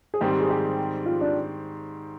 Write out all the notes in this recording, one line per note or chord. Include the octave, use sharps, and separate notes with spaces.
G#4
G#2 D#3 G3 C4 G4
G4
G#4
G4
F4
D4